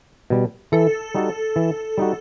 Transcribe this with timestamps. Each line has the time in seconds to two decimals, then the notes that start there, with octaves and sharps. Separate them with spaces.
0.30 B2 G3
0.72 E3 A4
1.15 G3 D#4 F#4
1.56 E3
1.98 G3 D#4 F#4